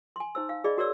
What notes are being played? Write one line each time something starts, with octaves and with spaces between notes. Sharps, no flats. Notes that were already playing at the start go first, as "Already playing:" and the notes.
G#5 C6
D#4 C5 E6
F5
G#4 D5 D#5 B5
F#4 A#4 C#5 D5 E6